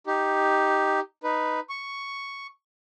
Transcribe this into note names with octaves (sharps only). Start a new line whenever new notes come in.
D#4 G4
D#4 B4
C#6